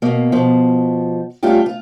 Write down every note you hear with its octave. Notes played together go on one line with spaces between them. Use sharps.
B2 A#3
B2 F3
G3 A3 C#4 F4 G4
F4